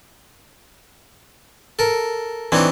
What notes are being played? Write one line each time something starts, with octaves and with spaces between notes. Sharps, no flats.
A4 A#4
E3 C4 D4 D#4 C#5